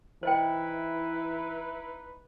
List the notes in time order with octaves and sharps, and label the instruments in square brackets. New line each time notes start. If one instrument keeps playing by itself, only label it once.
[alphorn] E3 [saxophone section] D#4 E4 B4 [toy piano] C5 D#5 G5